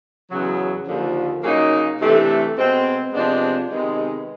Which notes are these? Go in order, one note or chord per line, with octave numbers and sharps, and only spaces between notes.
E2 C#3 F#3
D#2 D3 F3
C#3 F#3 A#3 D#4
C3 E3 A3 D4
B2 G#3 C4
C3 F3 G#3 B3 D4
C3 D#3 G#3 B3